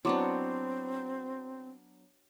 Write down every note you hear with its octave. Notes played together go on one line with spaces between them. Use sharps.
F#3 B3 C4 D4 E4 C6 D6